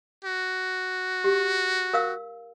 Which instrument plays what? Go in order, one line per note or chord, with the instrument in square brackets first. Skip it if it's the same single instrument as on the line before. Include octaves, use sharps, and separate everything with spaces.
[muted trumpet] F#4
[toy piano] G4
A#4 F5 E6